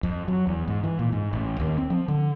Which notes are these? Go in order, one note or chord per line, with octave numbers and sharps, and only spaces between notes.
F2
F#3
E2
G#2
E3
A#2
G#2
A1
D#2
C4
F3
D3